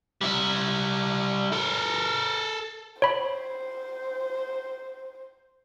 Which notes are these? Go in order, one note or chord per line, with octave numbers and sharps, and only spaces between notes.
G3 E4
A4 A#4
C5 C#5 B5